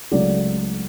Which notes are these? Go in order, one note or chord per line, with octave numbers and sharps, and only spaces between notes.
C#2 C#3 F#3 A3 D5